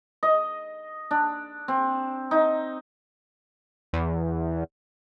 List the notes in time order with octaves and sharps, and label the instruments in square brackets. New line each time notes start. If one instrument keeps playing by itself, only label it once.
[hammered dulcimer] D#5
D4
C4
D#4
[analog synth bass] E2